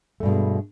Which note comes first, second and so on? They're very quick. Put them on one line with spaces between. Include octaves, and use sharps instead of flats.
A3 G2 B2 G#3